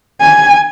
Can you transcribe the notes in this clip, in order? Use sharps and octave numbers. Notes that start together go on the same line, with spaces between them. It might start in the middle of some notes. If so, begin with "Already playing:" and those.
G#5